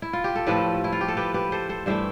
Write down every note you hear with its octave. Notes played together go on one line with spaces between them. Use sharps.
E4
F4
G4
A4
A2 F3 A3 G4 B4
E4
F4
G4
A4
G4 B4
G4 B4
A4 C5
A4 C5
G2 E3 A3 C5 E5